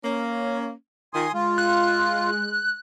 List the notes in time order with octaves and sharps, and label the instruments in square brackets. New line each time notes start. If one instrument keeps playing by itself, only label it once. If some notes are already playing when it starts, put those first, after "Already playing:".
[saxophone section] A#3 C#4
[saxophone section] D#3 F4 [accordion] G#5 C6 D#6
[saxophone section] G#3 [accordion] F4
[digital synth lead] F#6